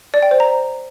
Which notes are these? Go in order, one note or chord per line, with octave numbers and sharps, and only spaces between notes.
D5
G5
C5
A#5